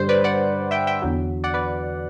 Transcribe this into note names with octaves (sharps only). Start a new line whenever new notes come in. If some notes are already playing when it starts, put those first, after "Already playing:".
Already playing: G2 D3 G3 C5
B4 D5
D5 F#5
E5 G5
E5 G5
E2 D3 F#3
D5 F#5
B4 D5